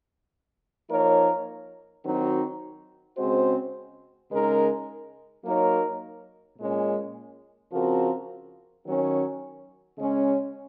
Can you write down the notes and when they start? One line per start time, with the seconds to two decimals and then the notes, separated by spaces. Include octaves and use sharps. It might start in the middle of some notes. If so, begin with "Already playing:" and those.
0.90 F3 A#3 D#4 A#4 C#5
2.05 D#3 F#3 C4 D#4 F#4
3.18 C#3 G#3 C4 F#4 C5
4.30 C#3 G#3 D#4 A#4
5.44 F#3 A#3 D#4 A#4 C#5
6.58 A#2 G#3 C#4
7.72 C#3 F3 C4 F#4 A#4
8.85 D#3 F#3 C#4
9.98 C#3 G#3 C#4